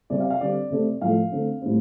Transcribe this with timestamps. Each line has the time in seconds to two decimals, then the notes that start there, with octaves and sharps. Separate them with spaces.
0.10 C3 G3 C4 D5
0.20 F5
0.30 F5
0.41 D3 G3 C4 D5
0.70 C3 A3 C4
1.01 A2 F3 A3 F5
1.32 D3 A3 C4
1.62 A2 G3 C4